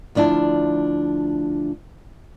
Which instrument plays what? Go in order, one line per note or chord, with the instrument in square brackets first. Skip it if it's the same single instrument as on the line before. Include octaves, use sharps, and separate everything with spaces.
[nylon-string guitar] D2 F3 D4 E4 A5